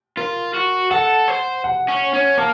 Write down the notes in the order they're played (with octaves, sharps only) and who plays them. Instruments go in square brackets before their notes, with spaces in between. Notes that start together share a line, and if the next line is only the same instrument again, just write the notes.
[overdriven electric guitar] F4 [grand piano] A#4
[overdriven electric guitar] F#4
[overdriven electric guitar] A4 [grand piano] F#5
[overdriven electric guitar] C5
[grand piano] F#5
[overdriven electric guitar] C#4
C#4
[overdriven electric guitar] A#3 [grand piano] A5